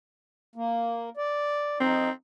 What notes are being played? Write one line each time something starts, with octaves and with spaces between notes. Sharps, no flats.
A#3
D5
C4 D#4